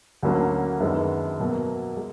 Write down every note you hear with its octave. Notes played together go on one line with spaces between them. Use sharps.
D2 D3 F#3 A#3 C#4
F#2 D#3 G#3 B3 D4
B2 F#3 A#3
G#3